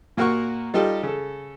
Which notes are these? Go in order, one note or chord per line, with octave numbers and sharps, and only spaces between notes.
A#2 A#3 F#4 A#4 F#5 C#6
G3 D#4 F4 G4 A4 D#5
C#3 A4